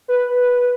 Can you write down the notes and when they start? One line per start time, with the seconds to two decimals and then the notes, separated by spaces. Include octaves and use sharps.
0.08 B4